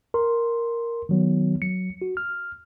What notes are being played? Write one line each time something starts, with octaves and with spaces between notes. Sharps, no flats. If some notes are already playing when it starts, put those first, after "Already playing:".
A#4 C6
D#3 F#3 B3
F#3 C#7
F#4
F6